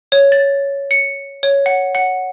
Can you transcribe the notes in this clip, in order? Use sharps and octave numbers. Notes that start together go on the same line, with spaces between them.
C#5
A6
C#7
C#5
F#5
F#5